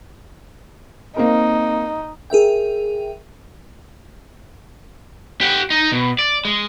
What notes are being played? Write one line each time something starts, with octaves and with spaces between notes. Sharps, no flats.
A#3 C4 D#4 A#4
G#4 A#4 E5 G5
G4 F#5
D#4
B2
D5
G#3